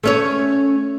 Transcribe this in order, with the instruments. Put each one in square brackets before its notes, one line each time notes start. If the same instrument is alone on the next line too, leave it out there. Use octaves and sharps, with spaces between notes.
[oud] A3 C#4 C#5